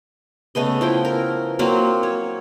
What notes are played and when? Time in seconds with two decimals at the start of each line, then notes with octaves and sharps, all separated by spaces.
0.55 C#3 A3 B3 D#5
0.81 F3 E4 G5
1.05 A#4
1.59 F#3 A#3 C4
2.03 C#5